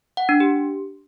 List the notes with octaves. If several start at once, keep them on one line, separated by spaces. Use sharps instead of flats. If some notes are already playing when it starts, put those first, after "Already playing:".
F#5
D4
G4